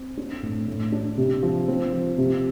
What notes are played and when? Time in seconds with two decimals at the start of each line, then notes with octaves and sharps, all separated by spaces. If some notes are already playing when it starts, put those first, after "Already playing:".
Already playing: C4
0.17 D4
0.43 A2
0.68 A2
0.92 D4
1.18 C3
1.43 F3
1.68 C4
1.93 F3
2.18 C3